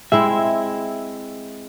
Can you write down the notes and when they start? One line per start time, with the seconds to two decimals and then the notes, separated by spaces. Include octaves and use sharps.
0.12 G#3 C4 E4 E5